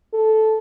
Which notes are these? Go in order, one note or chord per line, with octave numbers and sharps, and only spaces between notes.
A4